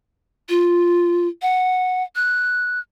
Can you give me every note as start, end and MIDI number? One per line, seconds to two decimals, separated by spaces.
0.49 1.27 65
1.42 2.03 78
2.16 2.80 90